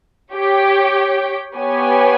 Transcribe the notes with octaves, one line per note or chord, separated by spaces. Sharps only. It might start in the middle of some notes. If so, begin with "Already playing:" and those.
G4 C#5 G5
B3 G4 C#5 G#5